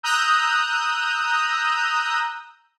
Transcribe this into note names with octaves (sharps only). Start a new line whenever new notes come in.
A#5 D#6 E6 F#6 G6